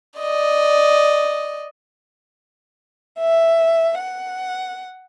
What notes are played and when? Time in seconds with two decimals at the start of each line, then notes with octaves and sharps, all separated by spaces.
0.20 D5 D#5
3.20 E5
3.98 F#5